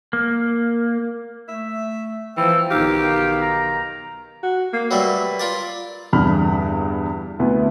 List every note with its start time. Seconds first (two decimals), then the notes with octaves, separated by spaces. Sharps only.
0.13 A#3
1.49 A3 E5
2.37 E3 F3 G5 E6
2.71 B1 D#3 D#4 G4 F5
3.41 A#5
4.43 F#4
4.73 A#3
4.91 F#3 G3 A3 B4
5.40 F4 A#4 D5
6.13 E2 G2 D3 B5 F6
7.39 D2 B3 E4